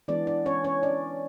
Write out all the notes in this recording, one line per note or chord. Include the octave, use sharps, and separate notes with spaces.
E3 G#3 B3 D4 D5
D4 D5
C#4 C#5
C#4 C#5
D4 D5